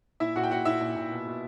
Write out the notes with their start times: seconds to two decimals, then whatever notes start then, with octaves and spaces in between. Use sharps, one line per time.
0.20 A#2 E4 E5
0.36 A#2 F#4 F#5
0.43 G5
0.51 A#2 F#4 F#5
0.65 A#2 E4 E5
0.81 A#2
0.96 A#2
1.11 B2
1.27 B2